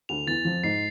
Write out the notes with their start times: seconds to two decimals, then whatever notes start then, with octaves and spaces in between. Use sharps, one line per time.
0.09 D2 D3 F7
0.27 E2 E3 A6
0.45 F2 F3 A6
0.63 G#2 G#3 C7